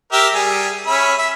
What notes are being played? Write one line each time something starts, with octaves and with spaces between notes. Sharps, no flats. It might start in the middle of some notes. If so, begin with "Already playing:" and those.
G4 A#4 E5
G3 G#4
C#4 E5 B5
E5